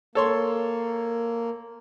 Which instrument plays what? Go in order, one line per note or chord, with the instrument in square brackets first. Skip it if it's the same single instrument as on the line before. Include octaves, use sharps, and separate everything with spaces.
[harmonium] A#3 [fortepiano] A4 C#5 C6